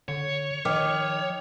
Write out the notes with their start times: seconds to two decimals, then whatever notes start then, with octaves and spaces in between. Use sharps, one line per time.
0.08 D3 C#5
0.65 D#3 F3 G5 D6 F6